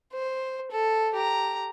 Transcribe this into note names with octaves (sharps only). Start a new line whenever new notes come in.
C5
A4
G4 A#5